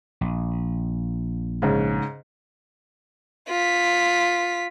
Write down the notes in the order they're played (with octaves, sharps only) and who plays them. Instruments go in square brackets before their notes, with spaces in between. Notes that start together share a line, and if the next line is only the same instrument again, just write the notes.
[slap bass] A#1
[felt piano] G#2 C#3
[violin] F4 B6